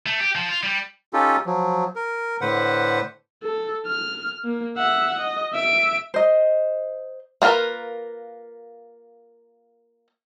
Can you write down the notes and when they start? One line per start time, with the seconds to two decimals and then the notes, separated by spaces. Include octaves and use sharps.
0.06 A3
0.20 G4
0.35 F3
0.49 F4
0.63 G3
1.13 C#4 D#4 F4 G4 A4
1.46 F3 F#3
1.96 A#4
2.41 A2 D3 B4 C5 F#5
3.43 A4
3.87 F6
4.45 A#3
4.77 E5 F#5
5.20 D#5
5.54 E5 D7
6.14 C5 D#5
7.42 A#3 D4 F4 A#4 B4